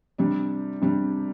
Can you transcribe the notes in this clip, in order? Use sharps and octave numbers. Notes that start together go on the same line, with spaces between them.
C3 G3 D4
C3 G3 D4